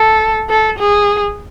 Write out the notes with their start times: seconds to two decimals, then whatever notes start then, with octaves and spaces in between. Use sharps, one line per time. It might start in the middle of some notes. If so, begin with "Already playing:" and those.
Already playing: A4
0.49 A4
0.79 G#4